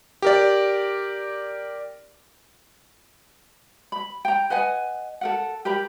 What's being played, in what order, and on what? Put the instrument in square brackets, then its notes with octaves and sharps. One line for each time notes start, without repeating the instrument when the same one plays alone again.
[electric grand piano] G4 A#4 D5
[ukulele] B5
G5 A#5
B4 D#5 F#5 G#5
A4 A#4 F#5
G4 A#4 A#5 B5